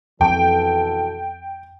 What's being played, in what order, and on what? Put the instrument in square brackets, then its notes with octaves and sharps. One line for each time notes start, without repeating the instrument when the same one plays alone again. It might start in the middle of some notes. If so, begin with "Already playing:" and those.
[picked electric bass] F2 [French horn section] B2 E3 A4 [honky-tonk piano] G5